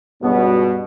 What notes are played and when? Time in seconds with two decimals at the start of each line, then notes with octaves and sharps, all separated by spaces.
0.22 C#2 G2 B2 B3